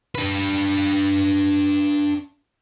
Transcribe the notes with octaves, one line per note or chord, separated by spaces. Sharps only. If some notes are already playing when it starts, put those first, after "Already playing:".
D4 B4